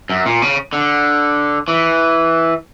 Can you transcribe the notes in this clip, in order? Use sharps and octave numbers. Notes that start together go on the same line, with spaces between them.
F#2
A#2
C#3
D3
E3